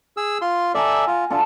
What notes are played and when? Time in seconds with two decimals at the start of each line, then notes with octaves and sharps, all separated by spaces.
0.17 G#4 E6
0.41 F4 C6
0.75 A4 D5 E5 F#5 G#5 A#5
1.08 F4
1.30 D3 D4 F4 A4